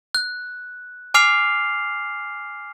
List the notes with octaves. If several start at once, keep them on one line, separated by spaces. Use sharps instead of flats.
F#6
G#5 D6 F6 C7 F7